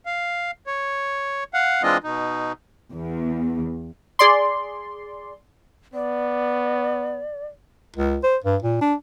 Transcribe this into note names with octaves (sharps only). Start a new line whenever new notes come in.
F5
C#5
F5 F#5
E3 G#3 C4 D4 F4 D#5
B2 D#4
E2
G#4 D5 C6
B3 D5
C#2
C5
G2
A#2
D4